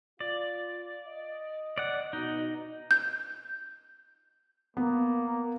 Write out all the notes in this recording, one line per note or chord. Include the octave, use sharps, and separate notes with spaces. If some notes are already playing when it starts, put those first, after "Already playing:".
F4 D5
D#5
D5 F#5
B2 D#4
G6
A#3 B3